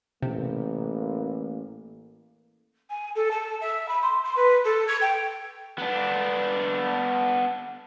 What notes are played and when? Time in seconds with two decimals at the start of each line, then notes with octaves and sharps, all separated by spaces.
0.23 A1 C3 A#3
2.90 G#5
3.15 A4
3.31 A5
3.61 E5
3.89 B5
4.02 C6
4.23 C6
4.36 B4
4.64 A4
4.88 G#6
5.01 G5
5.78 B3 D4